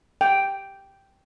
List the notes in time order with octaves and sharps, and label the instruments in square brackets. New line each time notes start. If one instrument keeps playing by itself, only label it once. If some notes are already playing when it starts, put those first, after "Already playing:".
[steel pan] G5